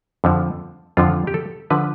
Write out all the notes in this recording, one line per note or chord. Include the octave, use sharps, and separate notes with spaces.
F2 D3 F3
F2 D3 F3 F4
G4
A4
D3 F3 B4